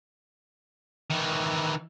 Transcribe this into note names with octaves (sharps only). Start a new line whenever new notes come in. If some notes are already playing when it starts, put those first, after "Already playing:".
D#3 E3